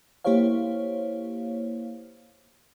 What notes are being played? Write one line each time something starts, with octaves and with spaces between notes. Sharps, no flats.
A#3 E4 G4 C5 C#5 F5